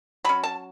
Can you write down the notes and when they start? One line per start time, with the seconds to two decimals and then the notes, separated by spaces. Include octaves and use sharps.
0.24 F#3 C#4 B5
0.43 A5